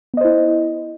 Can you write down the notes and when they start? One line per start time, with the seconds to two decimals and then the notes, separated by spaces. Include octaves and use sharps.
0.14 B3
0.17 D#5
0.21 C5
0.25 E4